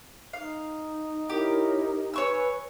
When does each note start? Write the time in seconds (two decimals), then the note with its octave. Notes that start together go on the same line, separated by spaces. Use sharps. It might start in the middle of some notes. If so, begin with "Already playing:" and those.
0.33 D#4 F5
1.29 E4 G4 A#4 C#5
2.14 B4 C#5 G#5 C#6 E6